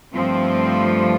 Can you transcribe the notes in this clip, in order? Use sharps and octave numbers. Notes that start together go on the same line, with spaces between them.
G2 F3 A3 C4